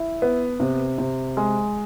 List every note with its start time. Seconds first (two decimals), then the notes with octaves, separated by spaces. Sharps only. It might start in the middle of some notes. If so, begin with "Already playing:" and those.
Already playing: E4
0.22 B3
0.60 C3
0.98 C3
1.37 G#3